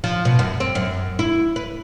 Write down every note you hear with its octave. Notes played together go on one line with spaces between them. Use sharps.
F3
B2
F#2
C4
F#2
E4
B4